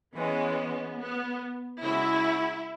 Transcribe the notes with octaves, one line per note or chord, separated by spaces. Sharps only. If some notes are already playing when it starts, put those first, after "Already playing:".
E3 G#3 B3 C#4
B3
C#3 G#3 C#4 E4 F#4